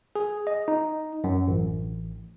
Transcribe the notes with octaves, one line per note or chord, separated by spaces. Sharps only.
G#4
D#5
D#4
F#2
A1